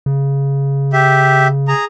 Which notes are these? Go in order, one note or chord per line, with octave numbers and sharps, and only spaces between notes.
C#3
G4 E5
G#4 A#5